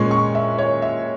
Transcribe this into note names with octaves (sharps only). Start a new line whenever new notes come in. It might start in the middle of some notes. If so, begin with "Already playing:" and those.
Already playing: A#2 G#3 C#4 C#6
C#6
E5
C#5
E5